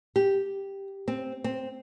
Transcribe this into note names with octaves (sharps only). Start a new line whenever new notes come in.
G4
C4
C4